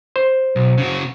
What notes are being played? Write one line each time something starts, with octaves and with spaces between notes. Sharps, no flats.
C5
B1
C#3 F#4